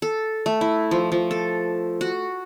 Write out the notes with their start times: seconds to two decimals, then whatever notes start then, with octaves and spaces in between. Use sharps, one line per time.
0.02 A4
0.46 A3
0.61 E4
0.91 F3
1.12 F3
1.31 A4
2.01 F#4